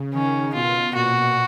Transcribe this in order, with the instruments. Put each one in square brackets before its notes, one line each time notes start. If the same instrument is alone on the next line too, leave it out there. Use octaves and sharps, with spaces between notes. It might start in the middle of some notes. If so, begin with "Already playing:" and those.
Already playing: [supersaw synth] C#3
[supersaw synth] D#3 [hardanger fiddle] C#4
[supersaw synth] B2 [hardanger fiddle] F4
[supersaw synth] A#2 [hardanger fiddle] F#4